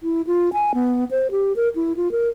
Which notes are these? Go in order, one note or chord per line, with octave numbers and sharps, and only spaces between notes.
E4
F4
G#5
B3
C5
G4
A#4
E4
F4
A#4